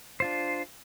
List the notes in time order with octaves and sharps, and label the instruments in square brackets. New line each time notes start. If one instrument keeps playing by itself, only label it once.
[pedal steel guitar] D4 F4 C5